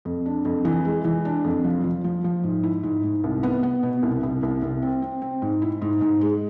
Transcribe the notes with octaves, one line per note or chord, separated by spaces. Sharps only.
F2
D4
F2
E3
G#3
E3
D4
F2
F3
F3
F3
F3
G#2
E4
G#2
G#2
C2
B3
B3
B2
C2
C2
C2
C2
C4
C4
C4
G#2
E4
G#2
G#2
G#3